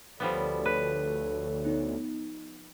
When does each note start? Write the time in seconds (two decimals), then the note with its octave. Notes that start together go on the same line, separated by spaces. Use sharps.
0.20 D2 F3 G3 B3 A4 C#5 F5
0.65 B4
1.65 B3 D#4